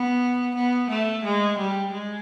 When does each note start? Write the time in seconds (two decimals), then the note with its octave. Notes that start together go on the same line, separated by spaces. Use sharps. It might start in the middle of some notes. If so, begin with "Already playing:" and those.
Already playing: B3
0.55 B3
0.90 A3
1.24 G#3
1.58 G3
1.92 G#3